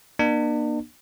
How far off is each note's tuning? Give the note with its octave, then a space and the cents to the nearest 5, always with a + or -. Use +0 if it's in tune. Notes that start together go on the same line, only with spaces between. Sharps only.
A#3 +35 D4 +40